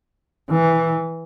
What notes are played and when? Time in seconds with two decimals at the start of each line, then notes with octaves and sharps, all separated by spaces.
0.50 E3